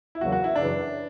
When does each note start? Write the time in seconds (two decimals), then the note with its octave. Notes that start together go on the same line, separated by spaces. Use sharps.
0.15 E4
0.20 E2 C#3 F#3 A#3 F#4
0.32 F#4
0.44 E4
0.56 F#2 C#3 E3 D4